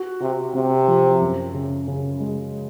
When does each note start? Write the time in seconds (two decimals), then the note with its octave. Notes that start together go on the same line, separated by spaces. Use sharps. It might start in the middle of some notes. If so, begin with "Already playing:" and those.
Already playing: F#4
0.21 C3 F#4
0.54 C3 C4
0.88 F3
1.21 F#2
1.54 C#3
1.88 C#3
2.20 G#3